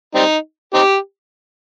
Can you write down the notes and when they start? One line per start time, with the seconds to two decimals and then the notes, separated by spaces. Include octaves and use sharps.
0.15 G3 C4 D#4
0.74 C4 D#4 G4